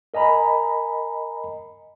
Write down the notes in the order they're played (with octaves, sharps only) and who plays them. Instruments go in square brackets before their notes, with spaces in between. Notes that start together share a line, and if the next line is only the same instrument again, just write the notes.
[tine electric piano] A#4 D#5 G#5 A#5 B5